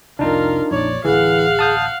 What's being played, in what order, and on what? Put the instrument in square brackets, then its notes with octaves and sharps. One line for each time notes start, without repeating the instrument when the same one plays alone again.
[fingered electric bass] F1 C2 [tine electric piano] D4 D#4 [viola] F4 A#4
[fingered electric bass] A#1 F2 [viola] C#5 D5
[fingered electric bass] A1 D2 [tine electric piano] E3 [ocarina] G#4 [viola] F5 F#5
[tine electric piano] A5 D#6 G6